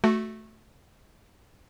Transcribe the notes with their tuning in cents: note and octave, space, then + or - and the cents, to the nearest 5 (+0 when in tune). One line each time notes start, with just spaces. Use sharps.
A3 -5 F#4 +0